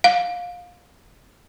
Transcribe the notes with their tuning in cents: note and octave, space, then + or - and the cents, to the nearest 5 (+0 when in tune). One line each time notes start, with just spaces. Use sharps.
F5 +20